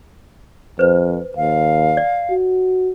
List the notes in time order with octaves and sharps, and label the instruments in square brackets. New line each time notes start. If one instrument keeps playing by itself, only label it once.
[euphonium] F2 [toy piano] B4 C5
[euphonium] D#2 [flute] F5
[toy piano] D5
[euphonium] F#4